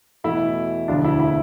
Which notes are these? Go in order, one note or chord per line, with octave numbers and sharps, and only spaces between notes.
E2 B2 A3 E4
E1 D2 D3 F3 D4 F4
E4
E4